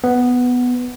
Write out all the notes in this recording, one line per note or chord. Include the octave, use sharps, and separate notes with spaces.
B3